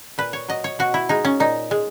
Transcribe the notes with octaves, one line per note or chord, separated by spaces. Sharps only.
A#2 B4
C#5
F#3 D#5
C#5
B2 F#4
E4
G#3 D#4
C#4
A#2 D#4
G#3